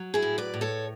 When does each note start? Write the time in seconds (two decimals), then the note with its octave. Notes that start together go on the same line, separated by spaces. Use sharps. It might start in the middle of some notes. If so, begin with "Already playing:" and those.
Already playing: F#3
0.14 E4 G#4
0.23 A2
0.38 B4 D5
0.54 A2
0.61 A4 C#5